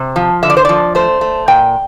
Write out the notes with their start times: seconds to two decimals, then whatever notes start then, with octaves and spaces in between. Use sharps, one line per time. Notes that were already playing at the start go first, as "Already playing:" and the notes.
Already playing: C3
0.16 F3
0.43 D3 E5
0.50 D5
0.57 C5
0.65 F3 D5
0.95 A3 C5
1.21 A3
1.48 A#2 G5